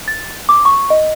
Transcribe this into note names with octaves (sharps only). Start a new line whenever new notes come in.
A6
D6
C#6
D#5